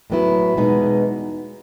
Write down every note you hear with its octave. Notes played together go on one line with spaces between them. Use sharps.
A2 F#3 B3 E4
E2 B2 G#3 B3 D#4